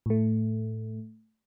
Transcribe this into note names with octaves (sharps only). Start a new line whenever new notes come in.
A2 A3